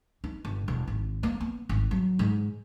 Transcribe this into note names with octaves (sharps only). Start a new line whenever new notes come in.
D#4
G1
E1
G#1
A#3
B3
G#1
F#3
G#2